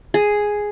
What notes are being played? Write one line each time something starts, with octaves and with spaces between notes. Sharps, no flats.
G#4